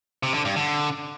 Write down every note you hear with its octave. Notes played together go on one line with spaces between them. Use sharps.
C3
D3
G2
D3